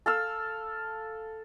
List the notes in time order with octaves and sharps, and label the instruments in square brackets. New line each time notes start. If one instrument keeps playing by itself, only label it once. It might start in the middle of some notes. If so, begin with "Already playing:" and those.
[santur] A4 F5 E6